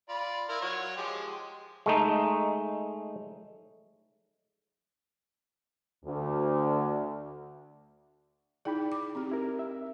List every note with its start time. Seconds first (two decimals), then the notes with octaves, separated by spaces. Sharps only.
0.09 F4 D5 B5
0.49 E4 F4 A#4
0.61 F#3 C#5
0.97 F3 G#3 G4
1.86 G#3 A3 D#4
6.05 D2
8.65 D#4 E4 G#4 D5 G5 B5
8.92 D6
9.15 C4 G4
9.31 E4 A#4
9.59 E5